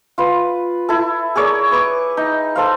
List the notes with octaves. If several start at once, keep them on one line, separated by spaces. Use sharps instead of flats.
F4 B4
E4 A4
G#4 A#4 C#5 D5
B4 C#6 D6
D#4
A4 C5 F5